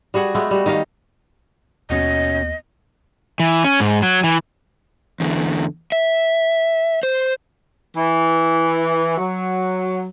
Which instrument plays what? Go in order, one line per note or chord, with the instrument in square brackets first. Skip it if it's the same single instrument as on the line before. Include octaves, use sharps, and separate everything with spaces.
[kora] G3 F#4 G#4 F#5
G#3 A3 B3
G3 F#4
D#3 G4 D#5 F5
[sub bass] D#2 [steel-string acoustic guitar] B2 C#4 [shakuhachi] D#5
[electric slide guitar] E3
C#4
G#2
F#3
E3
E2 D3
E5
C5
[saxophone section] E3
F#3